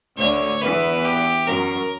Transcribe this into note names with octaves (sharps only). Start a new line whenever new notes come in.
D2 D3 C#5
E2 E3 B4
G4
F#2 F#3 A#4